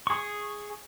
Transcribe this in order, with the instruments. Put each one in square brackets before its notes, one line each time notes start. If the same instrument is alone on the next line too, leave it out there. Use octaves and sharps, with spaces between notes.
[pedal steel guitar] G#4 C#6